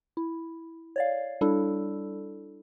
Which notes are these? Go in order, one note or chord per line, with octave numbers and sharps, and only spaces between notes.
E4
C#5 D5 F5
G3 D4 E4 A4